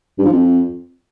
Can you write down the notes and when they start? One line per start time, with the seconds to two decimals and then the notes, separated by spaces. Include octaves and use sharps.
0.18 G2
0.26 F3
0.33 F2